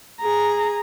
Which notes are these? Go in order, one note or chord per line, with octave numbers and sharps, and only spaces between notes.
G#4 A#5